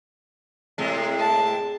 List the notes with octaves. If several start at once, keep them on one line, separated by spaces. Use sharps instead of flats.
A2 C3 G#3
A5